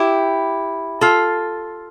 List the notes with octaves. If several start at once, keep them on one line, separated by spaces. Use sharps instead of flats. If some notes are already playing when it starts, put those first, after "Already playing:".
Already playing: E4 G4
F4 A4